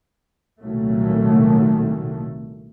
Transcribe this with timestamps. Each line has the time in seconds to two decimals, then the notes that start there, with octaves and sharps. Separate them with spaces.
0.61 C2 A#2 D#3 F#3 A3